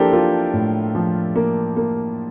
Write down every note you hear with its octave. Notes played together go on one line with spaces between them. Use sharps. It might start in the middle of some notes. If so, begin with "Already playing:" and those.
Already playing: F3 A#3 D4 E4 G4 A4 A#4 C5
A#3 F4
A2
F3
A#3
A#3